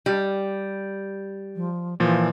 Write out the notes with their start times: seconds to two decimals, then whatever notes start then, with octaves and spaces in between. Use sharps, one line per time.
0.06 G3
1.56 F3
2.00 A#2 E3 F3